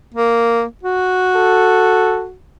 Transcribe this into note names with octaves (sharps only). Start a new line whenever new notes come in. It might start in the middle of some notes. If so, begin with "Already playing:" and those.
A#3
F#4
A4